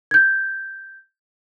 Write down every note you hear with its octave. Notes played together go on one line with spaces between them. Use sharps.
G6 G#6